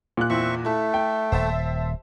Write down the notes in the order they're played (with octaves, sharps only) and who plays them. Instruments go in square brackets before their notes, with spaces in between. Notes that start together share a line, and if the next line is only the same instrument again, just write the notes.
[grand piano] A#2 F#6
[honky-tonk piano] E2 [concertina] C4 E5 C#6
[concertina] A3 [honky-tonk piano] E4 A4
[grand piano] G5
[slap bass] D#1 [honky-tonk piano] C5 E5 A5